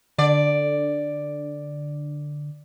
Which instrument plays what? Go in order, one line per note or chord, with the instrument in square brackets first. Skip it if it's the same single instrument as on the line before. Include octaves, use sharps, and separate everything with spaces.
[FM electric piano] D3 [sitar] D5